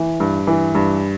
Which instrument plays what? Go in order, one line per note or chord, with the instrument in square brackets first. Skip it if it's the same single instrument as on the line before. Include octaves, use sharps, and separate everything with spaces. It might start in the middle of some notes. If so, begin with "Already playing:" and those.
Already playing: [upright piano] E3
G2
E3
G2